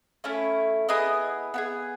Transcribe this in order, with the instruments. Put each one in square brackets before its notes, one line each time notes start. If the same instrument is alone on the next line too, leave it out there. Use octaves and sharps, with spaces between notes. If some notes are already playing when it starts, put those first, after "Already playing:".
[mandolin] A3 C#4 E4
B3 E4 G#4 D#5 D#6
B3 E4 G#4